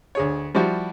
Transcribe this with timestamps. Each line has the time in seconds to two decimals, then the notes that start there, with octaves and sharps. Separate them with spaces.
0.15 D2 G#4 C#5
0.55 F3 G3 E4 F#4